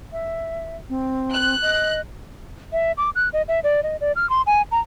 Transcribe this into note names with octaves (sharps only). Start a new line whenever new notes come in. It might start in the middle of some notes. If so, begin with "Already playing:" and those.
E5
C4
F#6
D#5
E5
D6
F#6
D#5
E5
D5
D#5
D5
F6
C6
G#5
A#5